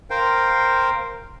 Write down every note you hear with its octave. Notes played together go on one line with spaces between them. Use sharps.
A#4 C5 F5 G5